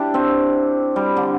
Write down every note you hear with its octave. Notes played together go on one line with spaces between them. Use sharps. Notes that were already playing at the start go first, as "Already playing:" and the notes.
Already playing: D4 E4 G4
C4
G3
D3